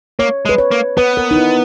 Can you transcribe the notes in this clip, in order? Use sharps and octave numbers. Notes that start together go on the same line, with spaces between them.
A#3 C#5
G#3
B4
C#5
A#3
B3 B4
A#4
D#4
E4